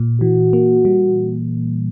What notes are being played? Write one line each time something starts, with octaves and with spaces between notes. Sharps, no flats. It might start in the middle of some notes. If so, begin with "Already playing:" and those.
Already playing: A#2
E3 F#4
A#3
G3